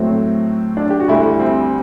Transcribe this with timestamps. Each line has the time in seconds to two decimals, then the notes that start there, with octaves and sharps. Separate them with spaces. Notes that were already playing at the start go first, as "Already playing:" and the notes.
Already playing: A2 F#3 A3 C4
0.77 D4
0.90 G4
1.00 F#4
1.08 D2 D3 G3 E4
1.40 C4